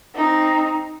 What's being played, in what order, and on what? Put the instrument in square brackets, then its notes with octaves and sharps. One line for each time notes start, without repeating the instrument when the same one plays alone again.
[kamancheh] C4 D#4